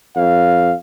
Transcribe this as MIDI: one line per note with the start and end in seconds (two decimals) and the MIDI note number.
0.16 0.72 41
0.16 0.77 77